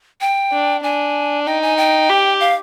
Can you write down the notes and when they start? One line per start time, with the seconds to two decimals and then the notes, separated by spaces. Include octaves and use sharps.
0.21 G5
0.53 D4
0.83 D4 G#5
1.46 D#4 G5
1.62 G#5
1.77 G5
2.09 G4
2.40 F5